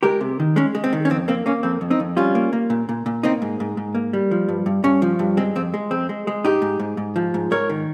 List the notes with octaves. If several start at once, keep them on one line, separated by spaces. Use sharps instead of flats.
G#3 G4 A#4
C3
D#3
G#3 C#4
G#3
C4
D#3
C#4
F2 C4
A#3 C4
A#3 C#4
F2 C4
F2
C4 D#4
F2
G3 C#4 F4
A#3
A#3
A#2
A#2
A#2
A#3 C4 D#4
G#2
G#2
G#2
A#3
G3
F3
G2
G2
G2 C#4
F3
G2
G#3 C4
F2 C4
G#3
F2 C4
G#3
G#3
G#2 D#4 G4
G#2
G#2
G#2
F3
G#2
G#2 A#4 C#5
D#3